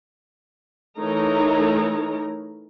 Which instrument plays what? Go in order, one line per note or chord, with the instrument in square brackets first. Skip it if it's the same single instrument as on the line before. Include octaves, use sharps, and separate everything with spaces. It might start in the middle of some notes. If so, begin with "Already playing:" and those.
[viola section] E3 A3 D#4 A#4 C#5 A#5